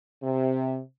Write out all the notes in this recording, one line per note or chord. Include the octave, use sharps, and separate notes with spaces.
C3